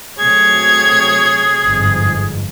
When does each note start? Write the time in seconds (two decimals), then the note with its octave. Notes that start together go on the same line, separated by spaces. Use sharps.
0.20 C3 F#3 A3 G#4 C#5 G#6
1.63 G1 F2 G#2